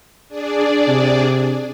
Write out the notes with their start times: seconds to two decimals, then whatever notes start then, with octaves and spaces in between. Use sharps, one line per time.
0.29 D4 G#4 D5
0.88 C3